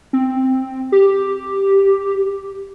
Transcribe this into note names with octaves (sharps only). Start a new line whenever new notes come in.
C4
G4